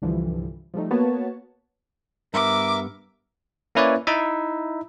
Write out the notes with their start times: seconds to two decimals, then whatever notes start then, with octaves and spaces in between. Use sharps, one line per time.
0.02 C2 G2 D3 E3 F3 G3
0.74 F3 G3 A3 D#4
0.91 A#3 B3 F#4 B4 C#5 A5
2.34 G2 B3 A#4 E5 D6
3.75 A#3 C#4 E4 B4 C#5 D5
4.07 D#4 E4 E5